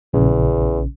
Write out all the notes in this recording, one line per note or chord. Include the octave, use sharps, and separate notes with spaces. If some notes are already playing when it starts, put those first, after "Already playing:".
A#1 E2 C#3